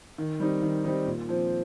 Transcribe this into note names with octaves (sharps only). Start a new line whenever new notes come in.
D#3
G3 C4 D#4
D#3
G3 C4 D#4
A#2
F3 C4